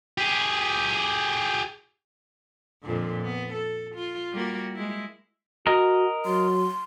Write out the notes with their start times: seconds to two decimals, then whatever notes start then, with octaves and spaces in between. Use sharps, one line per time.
0.18 G4 G#4
2.83 F2 A#2 D3
3.21 B3
3.53 A4
3.95 F4
4.33 G3 A#3 F#4
4.75 G#3 E4
5.67 F#4 A#4 D#5
6.25 F#3 C6